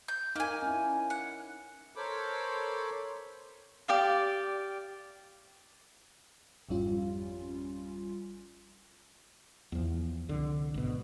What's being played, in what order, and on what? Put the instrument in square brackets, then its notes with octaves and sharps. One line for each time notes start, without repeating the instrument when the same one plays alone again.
[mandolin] G6
[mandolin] A#3 G#5 [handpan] D#4 A#4
[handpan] C#4 E4
[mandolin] F#5
[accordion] A4 A#4 C5 C#5 B5 D6
[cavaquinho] G4 D5 F5
[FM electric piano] G#1 F2 G3 C#4 F4
[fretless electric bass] E2 F3
C2 D3
G#1 B2